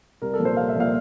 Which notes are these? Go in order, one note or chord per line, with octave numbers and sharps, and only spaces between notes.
C2 A#4
A4
A#2 F3 A#3
C5
C2 F5
E5
A#2 F3 A#3 F5